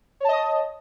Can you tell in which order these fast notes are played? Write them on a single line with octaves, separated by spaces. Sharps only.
C#5 A5 D#5 D#6